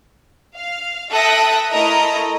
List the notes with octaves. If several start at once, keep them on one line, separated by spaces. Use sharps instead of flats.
F5
A4 E5 G5 D#6 F#6 A#6
A3 E4 A4 A#4 D#5 A#5